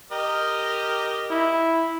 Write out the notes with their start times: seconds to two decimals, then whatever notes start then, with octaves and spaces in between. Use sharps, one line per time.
0.12 G4 A#4 D#5
1.31 E4